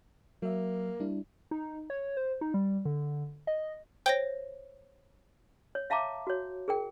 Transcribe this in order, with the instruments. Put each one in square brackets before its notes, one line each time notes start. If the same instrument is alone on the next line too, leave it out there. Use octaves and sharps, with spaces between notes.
[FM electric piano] F#3 E5 [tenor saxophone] A#3
[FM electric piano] G3 D4 E4
[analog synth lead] D#4
C#5
C5
D#4
G3
D3
D#5
[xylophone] C5 C#5 A#6 [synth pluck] G5
[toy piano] C#5
E5 F5 A5 A#5 D6
F#4 C#5
G#4 A#4 G5